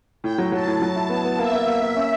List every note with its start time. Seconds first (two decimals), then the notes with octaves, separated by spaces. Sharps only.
0.23 A2 G5
0.38 F#3
0.52 F#3 A5
0.67 A2
0.81 F#3 A5
0.96 E4
1.10 B3
1.25 B3
1.39 A#3 E5
1.53 A#3
1.67 A#3
1.82 A#3
1.97 C#4